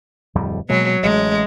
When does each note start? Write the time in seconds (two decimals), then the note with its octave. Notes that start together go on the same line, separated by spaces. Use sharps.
0.35 D1 F2 G3
0.69 B2 F#3 G#3 A#3
1.03 A1 G#3